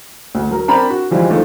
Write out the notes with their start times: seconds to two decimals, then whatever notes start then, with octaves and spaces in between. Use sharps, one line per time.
0.35 D2
0.51 F#3 A#4
0.68 C4 D4 A#4 C5 A#5 B5
0.90 F#4
1.11 E3 F3 G3 G#3 E4
1.30 D#3 F3 A3 D4